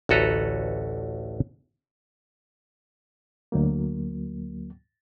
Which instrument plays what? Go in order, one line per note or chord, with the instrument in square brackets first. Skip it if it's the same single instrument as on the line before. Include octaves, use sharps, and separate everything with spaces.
[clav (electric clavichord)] A1 D2 F#4 A4 B4 A#5
[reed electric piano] D2 F#3 A#3